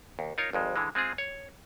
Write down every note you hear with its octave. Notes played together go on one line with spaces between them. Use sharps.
D#2
D#4 F4 A#4 C#5
G#1 F2 G#3
D3 E3 G#3
G#3 C4 F4 G#4
C#5